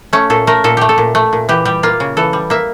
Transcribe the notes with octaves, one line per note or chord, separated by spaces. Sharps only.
A3 C#4
A#2 A4
A3 A#4
A#2 A4
A3 G4
A4
A#2
A3
A#2
E3 G4
G3 G4
A#3 F4
C#3
E3 A4
G3
A#3 E5